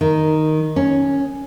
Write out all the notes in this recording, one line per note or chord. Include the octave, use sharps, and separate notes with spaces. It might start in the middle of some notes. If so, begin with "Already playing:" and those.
D#3
C#4